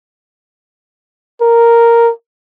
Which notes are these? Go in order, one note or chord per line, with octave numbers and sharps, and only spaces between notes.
A#4